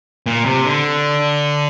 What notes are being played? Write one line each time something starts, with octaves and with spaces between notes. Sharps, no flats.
A#2
C3
D3